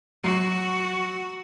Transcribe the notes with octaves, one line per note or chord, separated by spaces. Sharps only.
F#3 F#4